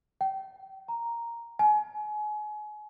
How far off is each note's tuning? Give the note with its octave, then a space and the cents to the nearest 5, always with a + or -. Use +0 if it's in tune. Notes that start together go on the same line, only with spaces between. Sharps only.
G5 -30
A#5 +0
G#5 +30